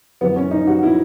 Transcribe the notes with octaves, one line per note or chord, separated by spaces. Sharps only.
F#2 E3 B3
C#4
D#4
F#4
E4